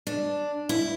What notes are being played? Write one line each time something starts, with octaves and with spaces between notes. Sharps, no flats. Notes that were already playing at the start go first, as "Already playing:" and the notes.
D4
E4